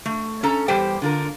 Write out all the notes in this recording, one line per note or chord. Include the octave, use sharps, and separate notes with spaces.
A3
C#4 A4 A#5
E2 G3 G4 C5 G5
D3 F4 A#4